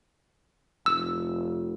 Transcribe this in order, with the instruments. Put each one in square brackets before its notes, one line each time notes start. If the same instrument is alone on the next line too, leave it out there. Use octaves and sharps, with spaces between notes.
[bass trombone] F1 [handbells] E6